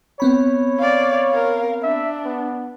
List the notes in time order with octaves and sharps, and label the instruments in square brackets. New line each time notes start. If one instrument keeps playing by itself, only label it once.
[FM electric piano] B3 C4 B5 [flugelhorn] C#5
[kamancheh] D5 F5
A#4 F5
[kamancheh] D4 [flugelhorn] E5
[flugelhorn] B3